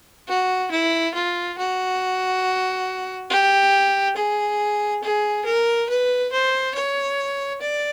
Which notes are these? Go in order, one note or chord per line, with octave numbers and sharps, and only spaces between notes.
F#4
E4
F4
F#4
G4
G#4
G#4
A#4
B4
C5
C#5
D5